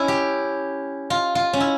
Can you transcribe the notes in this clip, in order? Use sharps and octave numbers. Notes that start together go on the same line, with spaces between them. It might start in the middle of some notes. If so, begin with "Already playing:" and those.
Already playing: C#4 E4
G4
F4
F4
C#4
E4